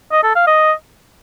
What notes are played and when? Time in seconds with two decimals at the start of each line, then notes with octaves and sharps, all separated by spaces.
0.12 D#5
0.24 A4
0.36 F5
0.47 D#5